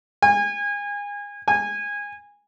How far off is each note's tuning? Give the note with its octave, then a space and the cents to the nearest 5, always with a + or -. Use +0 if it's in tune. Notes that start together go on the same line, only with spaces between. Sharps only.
G#5 -30
G#5 -20